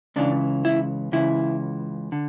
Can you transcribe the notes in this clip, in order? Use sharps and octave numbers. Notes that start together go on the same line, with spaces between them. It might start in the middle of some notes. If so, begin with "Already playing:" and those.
C#2 C#3 E3 D4
E4
C#2 C#3 E3 E4
D3